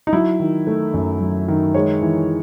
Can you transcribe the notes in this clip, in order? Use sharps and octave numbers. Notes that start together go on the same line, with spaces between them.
D#4
F#3 E4
D#3
A3
F#2
F#3
D#3
G#3 C#5
E3